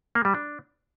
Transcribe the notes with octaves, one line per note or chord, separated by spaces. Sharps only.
A#3
G3
D4